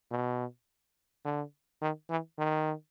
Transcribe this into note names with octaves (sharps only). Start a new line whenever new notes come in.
B2
D3
D#3
E3
D#3